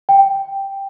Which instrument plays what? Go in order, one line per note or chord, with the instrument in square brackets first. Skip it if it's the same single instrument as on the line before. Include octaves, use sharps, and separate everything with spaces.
[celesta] G5